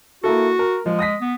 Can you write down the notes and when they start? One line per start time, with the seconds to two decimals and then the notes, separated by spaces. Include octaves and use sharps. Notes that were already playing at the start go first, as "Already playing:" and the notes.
0.24 A#3 E4 F#4 A4
0.59 A#4
0.86 F3 G#3
0.99 D#6 A#6 B6
1.21 B3